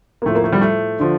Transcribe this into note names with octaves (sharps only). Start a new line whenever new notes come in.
A#3
A2 F3 A3
A#3
A3
G3
A3
D3 F3